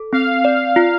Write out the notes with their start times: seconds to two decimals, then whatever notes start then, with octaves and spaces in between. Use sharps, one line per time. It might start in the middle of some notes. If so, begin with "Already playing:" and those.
Already playing: A4
0.13 C4 F5
0.45 D5
0.76 F4